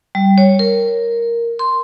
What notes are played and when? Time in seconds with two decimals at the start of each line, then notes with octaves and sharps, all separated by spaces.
0.15 G3
0.38 C#5
0.59 A#4
1.59 C6